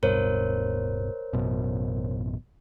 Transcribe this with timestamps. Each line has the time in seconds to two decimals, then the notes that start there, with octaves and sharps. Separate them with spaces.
0.03 D1 G2 B2 A#4 C5 C#5
1.33 A1 F#2 B2